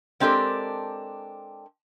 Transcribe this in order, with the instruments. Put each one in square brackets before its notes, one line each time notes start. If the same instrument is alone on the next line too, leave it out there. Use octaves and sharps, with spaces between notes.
[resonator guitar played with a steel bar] G#3 C4 D4 G4 A4 A#4